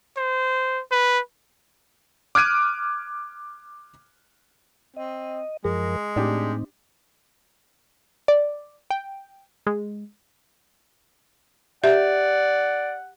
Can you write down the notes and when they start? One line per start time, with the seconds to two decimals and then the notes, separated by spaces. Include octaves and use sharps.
0.17 C5
0.92 B4
2.35 D6 F6 F#6 G#6 D7 D#7
4.97 C4 D#5
5.65 F#2 F3 G#3 G#4 A#4
6.16 A2 C4 D4 D#4 G4
8.28 D5
8.90 G5
9.66 G#3
11.84 G4 D5 E5 F#5